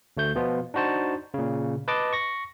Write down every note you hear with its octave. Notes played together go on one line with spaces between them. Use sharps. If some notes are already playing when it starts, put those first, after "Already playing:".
D2 A3 G6
B2 F3 B3 F4
D4 D#4 F#4 C5 A5
A#2 C#3
B4 D#5 A5 D6
C#6 A#6